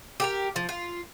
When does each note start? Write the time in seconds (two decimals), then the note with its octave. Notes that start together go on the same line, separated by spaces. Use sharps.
0.20 G4 G#4 A#4
0.56 F3
0.69 F4